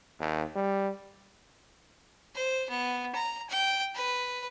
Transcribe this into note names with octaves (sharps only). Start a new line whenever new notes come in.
D#2
G3
C5
B3
A#5
G5
B4